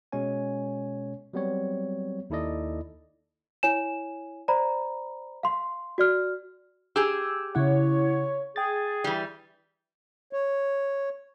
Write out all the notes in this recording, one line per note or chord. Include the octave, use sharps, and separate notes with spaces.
B2 G#3 C#4 C#5 G#5
F#3 G3 B3 C4 C#5
D#2 D#4 E4 A4 D5 D#5
E4 C#5 G#5 E7
C5 D5 A#5 B5
F5 C6
F#4 D5 F6
G4 G#4 E6
C#3 E4 C#5 F#5
G#4 G5 A6
E3 G3
C#5